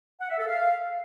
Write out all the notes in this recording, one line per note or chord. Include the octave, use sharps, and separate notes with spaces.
F#5
E5
A4
F5